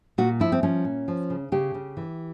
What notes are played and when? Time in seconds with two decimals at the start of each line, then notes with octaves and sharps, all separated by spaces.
0.18 A#2 F#4
0.40 F3 E4
0.52 C4
0.63 F3 C#4
0.84 A#2
1.08 F3
1.30 C#3
1.52 C#3 G4
1.74 C#3
1.97 E3